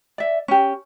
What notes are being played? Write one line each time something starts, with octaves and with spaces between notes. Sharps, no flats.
D5 E5
C#4 G4